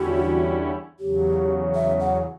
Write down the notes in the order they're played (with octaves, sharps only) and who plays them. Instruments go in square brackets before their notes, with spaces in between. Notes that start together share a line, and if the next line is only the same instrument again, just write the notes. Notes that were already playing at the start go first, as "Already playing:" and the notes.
Already playing: [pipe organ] E2 D3 G3 C#4 E4 [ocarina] F#4
[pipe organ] E2 C#3 F#3 [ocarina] G4
[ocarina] E5
F#5